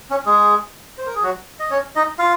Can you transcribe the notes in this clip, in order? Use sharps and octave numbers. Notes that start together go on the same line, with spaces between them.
C#4
G#3 G#4
C5
A#4
G#4
F#3 F#4
D#5
C#4 C#5
D#4 D#5
F4 F5